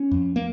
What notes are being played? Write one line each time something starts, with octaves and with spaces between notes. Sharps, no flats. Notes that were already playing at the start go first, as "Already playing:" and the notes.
Already playing: C#4
F2
A#3